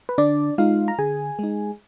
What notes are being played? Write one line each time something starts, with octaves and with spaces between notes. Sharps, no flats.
B4
D3 D4 D5
G#3 D#4 F4 F5
A#5
D3 G#4 G#5
G#3 D#4